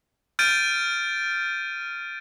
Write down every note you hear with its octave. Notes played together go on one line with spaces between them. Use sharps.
F6 G6 A6 D7 D#7